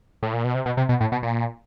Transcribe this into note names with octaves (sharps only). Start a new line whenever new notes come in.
A2
A#2
B2
C3
B2
C3
B2
A2
B2
A#2